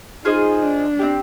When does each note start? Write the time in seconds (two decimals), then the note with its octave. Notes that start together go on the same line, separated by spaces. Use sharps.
0.25 D#4 F4 G#4 C5 D#5
0.62 D4
0.99 C4 E4 G4